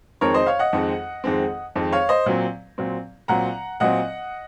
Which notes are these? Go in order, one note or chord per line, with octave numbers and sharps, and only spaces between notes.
F2 D#3 G#3 C4 A#4 C#5
C5 D#5
C#5 F5
D#5 F#5
F2 D#3 G#3 C4
F2 D#3 G#3 C4
F2 D#3 G#3 C4
C#5 F5
C5 D#5
A#2 F#3 C4
A#2 F#3 C4
A#2 F#3 C4 F#5 A#5
A#2 F#3 C4 D#5 F#5